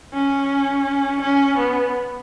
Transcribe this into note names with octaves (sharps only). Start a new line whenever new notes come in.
C#4
C#4
B3